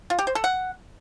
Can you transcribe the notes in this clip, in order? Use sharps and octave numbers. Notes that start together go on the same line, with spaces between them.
F4
G4
C5
A4
F#5